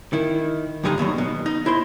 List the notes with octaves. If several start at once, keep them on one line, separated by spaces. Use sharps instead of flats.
D#3 E4
G2 D3 G3 G#3 B3 D#4
D#2 B2 D3 F#3
B2
D#4
E4 C5 C6